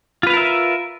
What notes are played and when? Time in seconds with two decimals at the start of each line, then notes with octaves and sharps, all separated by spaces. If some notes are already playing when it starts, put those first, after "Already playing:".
0.23 F4
0.27 B4
0.30 F5
0.33 A#4
0.37 E5